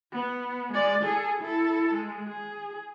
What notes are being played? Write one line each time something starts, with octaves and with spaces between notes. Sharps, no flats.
B3
G#3 D5
G#4 A4
E4 A4
G#3
G#4